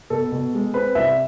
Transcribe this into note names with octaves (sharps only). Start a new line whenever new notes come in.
B2 A4
B2
G#3
C4 B4
C2 E5